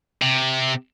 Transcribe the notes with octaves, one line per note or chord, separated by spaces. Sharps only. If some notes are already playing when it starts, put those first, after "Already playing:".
C3